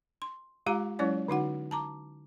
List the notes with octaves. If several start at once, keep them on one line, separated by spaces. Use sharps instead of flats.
C6
G#3 F4 G4 F5 A#5 D6
F#3 G#3 C#4 E4 C#5 D5
D3 D#4 F#4 F#5
A5 A#5 D6